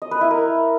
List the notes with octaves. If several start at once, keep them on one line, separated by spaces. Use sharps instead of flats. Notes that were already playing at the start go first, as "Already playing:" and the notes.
D#5
B4
E4
A#4